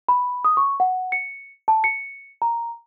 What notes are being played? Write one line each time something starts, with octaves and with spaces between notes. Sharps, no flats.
B5
D#6
C#6
F#5
C#7
A5
C#7
A#5